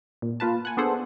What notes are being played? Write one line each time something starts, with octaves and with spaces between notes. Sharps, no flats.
A#2
A#3 F4 B4 A5
F#5 G#5
B3 D4 G#4 A4 C5 F#5